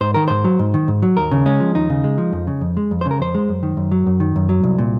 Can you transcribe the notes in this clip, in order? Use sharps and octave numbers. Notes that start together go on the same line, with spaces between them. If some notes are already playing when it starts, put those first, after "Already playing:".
G#2 C5
D#3 A#4
G#2 C5
F#3
G#2
D#3
G#2
F#3
D#2 A#4
C#3
G#3 C#4
F3
D#2 D#4
C#3
G#3
F3
F2
C#3
F2
G#3
F2
C5
C#3
A#4
F2 C5
G#3
F#2
D#3
F#2
F#3
F#2
D#3
F#2
F#3
C2
A#2